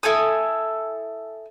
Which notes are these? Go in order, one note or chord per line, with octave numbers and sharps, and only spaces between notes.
E4 A4 G#5 D#6